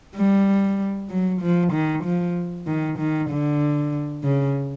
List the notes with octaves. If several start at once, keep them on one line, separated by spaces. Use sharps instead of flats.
G3
F#3
F3
D#3
F3
D#3
D#3
D3
C#3